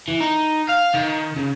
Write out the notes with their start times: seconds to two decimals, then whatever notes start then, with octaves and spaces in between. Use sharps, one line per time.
0.08 E3
0.20 D#4
0.69 F5
0.95 D#3
1.37 C#3